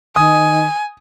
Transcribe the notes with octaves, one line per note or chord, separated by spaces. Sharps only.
D#3 G#5 D#6